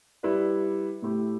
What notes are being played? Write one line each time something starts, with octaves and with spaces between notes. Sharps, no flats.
G3 E4 B4 D5
A2 A3 E4 G4